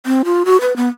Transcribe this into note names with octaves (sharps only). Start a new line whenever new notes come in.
C4
F4
F#4
B4
B3